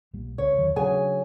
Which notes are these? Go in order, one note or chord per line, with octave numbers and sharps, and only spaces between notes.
B1 A#2 G3
C#2 C#5
E2 D#3 F#3
C#3 F#3 D4 G#4 G#5